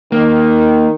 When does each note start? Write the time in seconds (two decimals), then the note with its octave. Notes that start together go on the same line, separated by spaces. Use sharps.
0.12 D#3 A#3